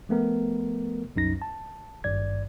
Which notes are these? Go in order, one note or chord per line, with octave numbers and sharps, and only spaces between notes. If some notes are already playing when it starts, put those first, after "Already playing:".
F3 A3 B3 A#4
C2 F#2 D#4 A#6
A5
G#1 G2 D5 G#6